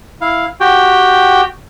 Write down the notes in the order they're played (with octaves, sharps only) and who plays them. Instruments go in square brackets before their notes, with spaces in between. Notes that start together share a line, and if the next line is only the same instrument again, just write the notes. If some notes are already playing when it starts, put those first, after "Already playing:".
[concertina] E4 F5
F#4 G4 G5